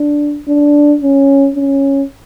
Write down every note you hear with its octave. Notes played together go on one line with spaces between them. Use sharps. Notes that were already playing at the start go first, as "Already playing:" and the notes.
Already playing: D4
D4
C#4
C#4